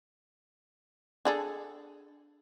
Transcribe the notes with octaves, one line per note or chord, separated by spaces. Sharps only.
D4 G#4 A4